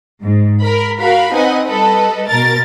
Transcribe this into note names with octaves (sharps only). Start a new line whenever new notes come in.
G#2
A#4 B5
F#4 A#4 F5 B5
C4 D#4 B4 D#5 F#5 G#5
G3 A4 B4 D#5
B2 A#4 A6